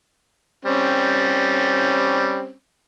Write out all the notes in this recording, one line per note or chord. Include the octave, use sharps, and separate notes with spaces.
G3 C4 C#4